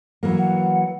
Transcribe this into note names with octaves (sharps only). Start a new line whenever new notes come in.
E3 F#3 A#3
F#5